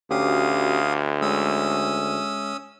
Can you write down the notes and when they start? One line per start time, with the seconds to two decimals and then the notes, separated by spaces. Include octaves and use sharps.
0.11 D2 C#4 F#4 G4 F5 D#6
1.22 G#3 C#4 E5 D#6 E6